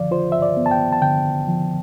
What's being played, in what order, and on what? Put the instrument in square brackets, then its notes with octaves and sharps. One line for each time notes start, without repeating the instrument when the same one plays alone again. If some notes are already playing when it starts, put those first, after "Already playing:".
Already playing: [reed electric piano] D3 F3 D5 F5
F4 C5
E5
D5
B3
A5
G5
A5
D3 G5
F3